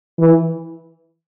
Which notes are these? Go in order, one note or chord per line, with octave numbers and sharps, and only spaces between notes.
E3